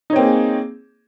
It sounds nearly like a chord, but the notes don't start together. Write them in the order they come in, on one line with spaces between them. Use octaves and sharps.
D#4 C#5 C4 A#3 G#4